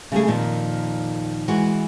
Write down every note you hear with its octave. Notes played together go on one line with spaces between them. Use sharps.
C#3 G3 A3 G#4
F2 A#2 D#3 F3
E3 G#3 F#4